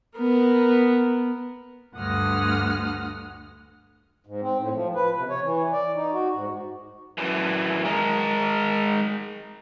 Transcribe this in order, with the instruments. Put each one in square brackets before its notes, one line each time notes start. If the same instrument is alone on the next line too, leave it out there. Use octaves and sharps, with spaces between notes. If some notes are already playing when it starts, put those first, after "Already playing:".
[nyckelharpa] B3 A#4
[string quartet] D2 G2 F#5 D#6 F6
[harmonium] G#2
C4
A2
F3
B4
C3
C#5
E3
D5
D#4
F#4
G#2
[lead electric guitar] F#2 E3
G#3 A#4